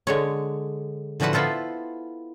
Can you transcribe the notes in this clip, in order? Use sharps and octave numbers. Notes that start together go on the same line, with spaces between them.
D3 G#3 C#5
A2 D3 F3 F#4 B4 F#5
B3 E4 F4 A4 C5